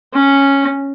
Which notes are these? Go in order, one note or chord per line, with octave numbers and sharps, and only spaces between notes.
C#4